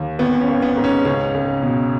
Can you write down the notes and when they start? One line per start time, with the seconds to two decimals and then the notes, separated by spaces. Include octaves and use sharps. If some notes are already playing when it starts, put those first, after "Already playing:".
Already playing: D#2
0.19 G#1 B3
0.40 C#4
0.48 G#1
0.62 B3
0.77 G#2
0.84 C#4
1.05 C#2 C#4
1.34 C#2
1.62 B2